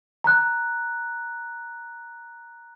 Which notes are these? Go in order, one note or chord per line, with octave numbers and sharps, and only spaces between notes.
A#5 F#6